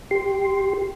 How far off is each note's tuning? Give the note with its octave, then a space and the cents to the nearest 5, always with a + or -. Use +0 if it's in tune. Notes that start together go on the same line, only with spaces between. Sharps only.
G4 +0 C6 +0